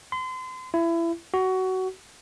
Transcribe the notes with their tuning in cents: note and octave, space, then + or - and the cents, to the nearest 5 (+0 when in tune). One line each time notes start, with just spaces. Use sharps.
C6 -35
E4 +25
F#4 +20